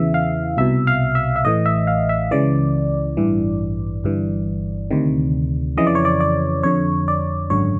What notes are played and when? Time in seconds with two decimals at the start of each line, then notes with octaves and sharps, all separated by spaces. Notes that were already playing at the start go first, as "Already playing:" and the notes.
Already playing: E2 C#3 E3 E5
0.14 F5
0.58 C2 B2 E5
0.87 F5
1.15 E5
1.36 E5
1.45 A1 A2 E3 D#5
1.66 E5
1.87 F5
2.09 E5
2.31 C#2 C#3 E3 D5
3.17 A1 G2 E3
4.04 G1 G2 E3
4.91 D2 C3 D#3
5.77 F2 C#3 E3 D#5
5.87 D5
5.95 C#5
6.05 D5
6.20 D5
6.63 F2 D3 C#5
7.08 D5
7.50 G#1 F#2 D3 C#5